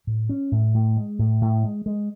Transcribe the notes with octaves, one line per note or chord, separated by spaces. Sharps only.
A2
C#4
A2
A2
G#3
A2
A2
G#3
G#3